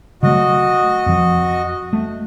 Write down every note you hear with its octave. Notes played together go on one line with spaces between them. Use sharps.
C#3 F#3 A3 F#4 D#5
F2 F3
A3